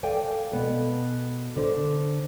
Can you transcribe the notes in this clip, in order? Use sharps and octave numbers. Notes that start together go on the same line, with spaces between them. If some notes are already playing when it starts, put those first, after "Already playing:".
A4 D5 F5 G5 G#5
B2 B3 A4
D3 C5